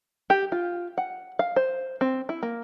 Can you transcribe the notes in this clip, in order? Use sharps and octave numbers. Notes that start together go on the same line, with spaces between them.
G4
F4
F#5
F5
C5
C4
E4
A#3